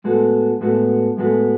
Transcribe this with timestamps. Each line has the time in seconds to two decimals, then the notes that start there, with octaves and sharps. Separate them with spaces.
0.04 A2 G#3 B3 F#4 A4
0.61 A2 G#3 B3 F#4 A4
1.17 A2 G#3 B3 F#4 A4